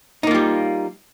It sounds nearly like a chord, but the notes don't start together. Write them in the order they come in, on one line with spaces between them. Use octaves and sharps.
D#4 A#3 F4 G3